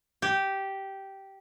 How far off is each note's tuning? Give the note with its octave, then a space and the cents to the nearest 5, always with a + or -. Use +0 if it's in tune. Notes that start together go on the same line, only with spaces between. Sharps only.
G4 -10